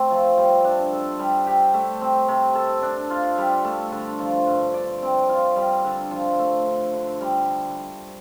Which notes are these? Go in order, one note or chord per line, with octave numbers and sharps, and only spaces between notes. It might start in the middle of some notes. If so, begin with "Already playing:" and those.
Already playing: A3 C4 A4
F3
G3
D4
A4
G3
G4
A3
C4
C3
A4
D4
F4
G3
A3
D3
F3
G2
D5
C4
F4
G3
D3
F3
A3
D3
D3
G3